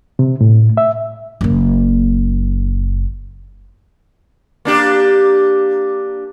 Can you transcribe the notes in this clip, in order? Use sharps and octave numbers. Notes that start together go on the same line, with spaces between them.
C3
A2
E5
F#1 A#3
A#3 D4 G4